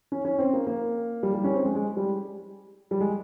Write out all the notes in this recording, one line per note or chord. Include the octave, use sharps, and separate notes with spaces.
C#4
C#4
C4
A#3
A#3
G3
G3
C#4
C4
G#3
G#3
G3
G3
G#3